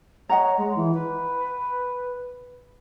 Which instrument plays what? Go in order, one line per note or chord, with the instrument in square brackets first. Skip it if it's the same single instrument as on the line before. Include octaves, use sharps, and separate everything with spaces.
[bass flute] C#5 [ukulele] D#5 F#5 A#5
[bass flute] G#3
E3
B4